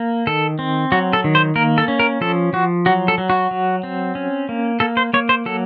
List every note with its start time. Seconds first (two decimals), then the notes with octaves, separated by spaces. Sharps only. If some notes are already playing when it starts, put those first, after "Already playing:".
Already playing: A#3
0.27 D#3 A4
0.59 C4
0.92 F#3 F#4
1.13 A4
1.24 D#3
1.35 C5
1.56 A#3 A#4
1.78 A4
1.88 C#4
2.00 A#4
2.21 F3 A4
2.53 F3 F#4
2.86 F#3 F#4
3.08 A4
3.18 F#3
3.30 F#4
3.51 F#3
3.83 C4
4.15 C#4
4.49 A#3
4.80 A#3 A4
4.97 C5
5.13 A#3 C#5
5.29 C5
5.46 F#3 A4